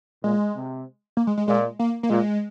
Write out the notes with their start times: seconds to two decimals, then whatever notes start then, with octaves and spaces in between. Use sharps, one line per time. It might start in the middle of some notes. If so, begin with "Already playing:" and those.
0.24 A#2 G#3
0.56 C3
1.17 A#3
1.27 G#3
1.38 G#3
1.48 A#2 G#3
1.79 A#3
2.03 A#3
2.10 A#2 G#3